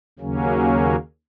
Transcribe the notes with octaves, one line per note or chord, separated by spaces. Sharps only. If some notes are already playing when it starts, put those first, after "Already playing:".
D#2 C#3 F#3 A#3 C#4